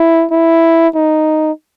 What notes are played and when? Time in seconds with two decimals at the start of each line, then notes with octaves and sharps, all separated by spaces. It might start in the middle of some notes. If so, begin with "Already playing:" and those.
Already playing: E4
0.31 E4
0.95 D#4